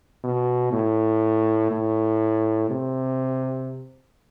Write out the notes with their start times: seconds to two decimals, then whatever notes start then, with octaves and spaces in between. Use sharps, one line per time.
0.24 B2
0.72 A2
1.71 A2
2.70 C3